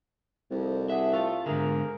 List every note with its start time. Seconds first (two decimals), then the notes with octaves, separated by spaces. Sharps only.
0.51 C2 F2
0.89 D4 G#4 E5 F#5
1.13 A3 F4
1.46 G#2 D3 A#3 G#4 A#4